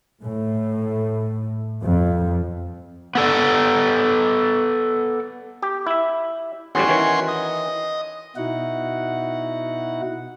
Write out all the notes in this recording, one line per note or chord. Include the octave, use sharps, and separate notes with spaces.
A2
F2
B3 A4 D5
G4
E4 E5
E2 A2 G3 C#4 F#4 C6
D#3 E3 C#5
D#5
B2 D#4 E4 F#4 F#5